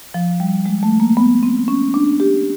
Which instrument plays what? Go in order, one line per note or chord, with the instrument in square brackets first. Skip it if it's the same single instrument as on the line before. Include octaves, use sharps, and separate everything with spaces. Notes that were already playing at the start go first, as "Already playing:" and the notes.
[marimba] F3
G3
G#3
A3
A#3
B3
C4
C#4
D4
G4